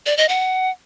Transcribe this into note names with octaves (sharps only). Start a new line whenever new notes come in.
D5
D#5
F#5